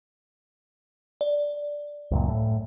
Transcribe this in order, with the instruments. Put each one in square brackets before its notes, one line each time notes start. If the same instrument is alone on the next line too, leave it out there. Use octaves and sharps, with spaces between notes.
[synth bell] D5
[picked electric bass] C#2 F#2 A#2
A2